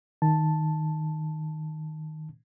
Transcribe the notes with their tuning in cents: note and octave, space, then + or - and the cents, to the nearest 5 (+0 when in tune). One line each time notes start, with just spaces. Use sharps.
D#3 +0 A5 +0